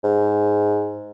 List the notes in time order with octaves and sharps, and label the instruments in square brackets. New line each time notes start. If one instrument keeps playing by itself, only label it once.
[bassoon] G#2